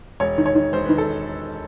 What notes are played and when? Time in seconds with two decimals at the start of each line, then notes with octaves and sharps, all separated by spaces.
0.20 E1 C#5
0.38 D#3
0.46 C#5
0.55 D#3
0.73 E1 C5
0.85 D#3 B4
0.98 A4